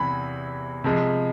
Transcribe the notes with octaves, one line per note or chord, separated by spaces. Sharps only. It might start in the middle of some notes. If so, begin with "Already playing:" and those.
Already playing: E2 C3 E3 B5
C3 F3 G#3